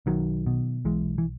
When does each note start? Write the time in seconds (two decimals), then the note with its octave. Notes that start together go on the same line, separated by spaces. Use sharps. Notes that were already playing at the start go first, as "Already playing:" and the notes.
0.06 B1 D#3 F#3
0.46 B2
0.85 B1 E3 G#3
1.18 E3